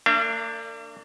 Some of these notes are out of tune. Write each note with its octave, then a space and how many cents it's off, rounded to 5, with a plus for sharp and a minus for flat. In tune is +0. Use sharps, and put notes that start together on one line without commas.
A#3 -45 D4 +0 E5 +40